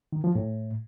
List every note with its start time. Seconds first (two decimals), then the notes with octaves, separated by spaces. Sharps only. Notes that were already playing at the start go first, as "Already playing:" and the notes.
0.13 D#3
0.24 F3
0.35 A2